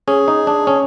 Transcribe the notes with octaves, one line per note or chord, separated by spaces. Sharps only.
C#4 G#4
D#4
D4
C#4